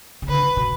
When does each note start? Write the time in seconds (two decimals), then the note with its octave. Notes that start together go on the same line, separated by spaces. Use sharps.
0.22 C#3
0.28 D3 B4
0.42 C#3
0.57 B2